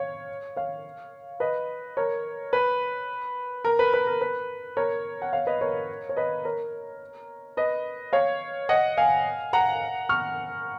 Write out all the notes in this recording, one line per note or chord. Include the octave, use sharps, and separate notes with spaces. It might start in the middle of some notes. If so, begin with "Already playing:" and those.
Already playing: C#5 F5
C#5 F5
B4 D#5
A#4 C#5
B4
A#4
B4
B4
A#4
B4
A#4 C#5
F#5
C#5 F5
B4 D#5
A#4 C#5
C#5
B4 D#5
A#4 C#5
B4 D#5
C#5 F5
D#5 F#5
F5 G#5
F#5 A#5
C#6 F6